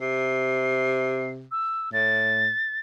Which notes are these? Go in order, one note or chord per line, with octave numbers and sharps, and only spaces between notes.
C3 C7
E6
A2 A6